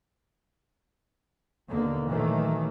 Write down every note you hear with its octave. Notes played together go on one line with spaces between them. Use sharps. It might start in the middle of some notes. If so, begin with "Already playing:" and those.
D#2 B2 D3 A#3
A#2 D#3 E3 F#3 A3 A#3